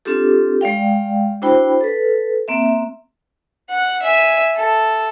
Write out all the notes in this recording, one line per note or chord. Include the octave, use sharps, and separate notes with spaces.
C4 D4 F4 G4 A4
G#3 D5 F5 G5
D4 E4 F#4 C5 G5 B5
A4 B4
A#3 C4 E5
F#5
E5 G#5
A4